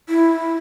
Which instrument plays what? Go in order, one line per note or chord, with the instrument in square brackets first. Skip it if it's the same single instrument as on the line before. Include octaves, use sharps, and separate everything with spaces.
[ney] E4